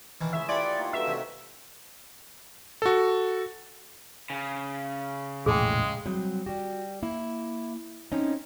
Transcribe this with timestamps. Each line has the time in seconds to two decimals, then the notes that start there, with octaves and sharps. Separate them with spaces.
0.21 B2 D#3 E3
0.33 C#2 A3 E4 G#4 E5
0.49 E4 F4 G4 B4 D5 F#5 G#5 C6
0.78 A#3 D#4 F4
0.93 G2 F#4 G4 A4 E5
1.07 C3 A3 G4 A#4
2.82 F#4 A4
4.30 C#3
5.46 E1 A#1 A2 G#3 G#4 G5
6.06 F#3 G3 C4
6.46 G3 F#4 G4
7.03 A#3 E4
8.12 C4 C#4 D#4 E4 D#5